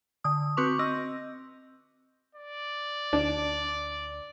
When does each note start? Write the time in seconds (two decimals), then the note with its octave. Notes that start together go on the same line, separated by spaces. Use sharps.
0.24 D3 D#6
0.57 C4 F#4 B4 C#6 D6 F7
0.79 C4 D#5 E6 A#6
2.35 D5
3.13 D2 D4